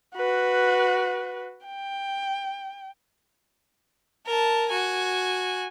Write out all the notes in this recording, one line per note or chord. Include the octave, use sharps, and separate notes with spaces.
F#4 B4
G5
A#4 A5
F#4 G#5